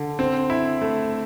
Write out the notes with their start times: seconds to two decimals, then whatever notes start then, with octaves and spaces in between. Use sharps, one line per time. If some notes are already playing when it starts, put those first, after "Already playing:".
Already playing: D3
0.19 C4
0.50 E4
0.81 A3